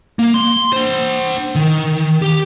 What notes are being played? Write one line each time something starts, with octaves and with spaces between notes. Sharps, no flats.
A#3
C6
D4 C5
D#3
G4